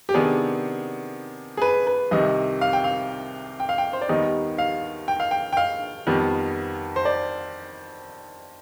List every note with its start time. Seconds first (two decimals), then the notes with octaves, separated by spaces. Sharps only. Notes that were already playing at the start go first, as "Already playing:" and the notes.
0.09 G4
0.14 C3 D#3 B3 D4 G#4
1.57 G#4
1.62 B4
1.87 B4
2.11 C2 C3 D#3 D#5
2.61 F5
2.73 G5
2.84 F5
3.60 G5
3.69 F5
3.78 G5
3.93 C5
4.01 D5
4.09 D#2 D#3 G3 B3 D#4 D#5
4.58 F5
5.08 G5
5.20 F5
5.31 G5
5.53 G5
5.57 F5
6.07 F2 D#3 G3 B3
6.96 C5
7.05 D5